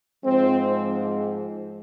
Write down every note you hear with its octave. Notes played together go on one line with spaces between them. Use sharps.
G#2 F3 G#3 C4